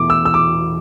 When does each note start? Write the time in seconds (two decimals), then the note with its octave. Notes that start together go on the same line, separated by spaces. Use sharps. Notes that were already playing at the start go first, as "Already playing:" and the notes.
Already playing: E2 B2 A3 E4 D6
0.10 E6
0.25 E6
0.34 D6